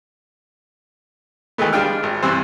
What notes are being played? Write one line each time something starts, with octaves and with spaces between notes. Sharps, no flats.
D#3 E3 G#3 A3 B3
G3 G#3 D4 F4 G5 F6
G#1
G2 C3 E3 C5